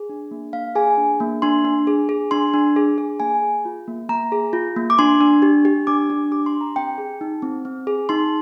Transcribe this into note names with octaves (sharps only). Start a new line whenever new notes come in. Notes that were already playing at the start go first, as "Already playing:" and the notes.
Already playing: G#4
D4
A#3
A#3 F5
G#4 G#5
D4
A#3
D4 C6
D4
G#4
G#4
D4 C6
D4
G#4
G#4
A#3 G#5
G#4
F4
A#3
A#3 A#5
G#4
F4
A#3
D6
D4 C6
D4
G4
G4
D4 D6
D4
G4 D6
C6
G4
A#5
C4 G5
G#4
D#4
C4
C4
G#4
D#4 C6